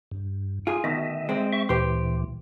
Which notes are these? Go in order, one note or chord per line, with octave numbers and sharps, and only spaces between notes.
G2
F4 G#4
D2 B2 D#3 D#5 E5
G#3 C4
E5 C#6
D2 A#2 E3 G4 C5